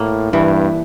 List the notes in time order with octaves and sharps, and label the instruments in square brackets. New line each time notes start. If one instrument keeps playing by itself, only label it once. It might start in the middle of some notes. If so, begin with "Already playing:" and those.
Already playing: [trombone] A2 [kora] A#3
[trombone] G2 [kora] E3